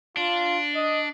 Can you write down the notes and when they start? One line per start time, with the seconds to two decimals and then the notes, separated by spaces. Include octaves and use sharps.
0.17 D4 F4
0.75 D#5